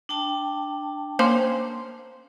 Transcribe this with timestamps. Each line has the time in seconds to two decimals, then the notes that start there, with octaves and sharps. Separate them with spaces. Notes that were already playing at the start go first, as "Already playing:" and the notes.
0.09 D4 G5 A5
1.19 A#3 C#4 C5